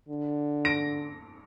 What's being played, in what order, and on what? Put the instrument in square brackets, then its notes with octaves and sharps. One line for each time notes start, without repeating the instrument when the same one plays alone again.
[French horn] D3
[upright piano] A#6 D7